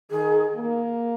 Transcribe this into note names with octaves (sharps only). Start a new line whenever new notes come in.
D#3 G#4
A#3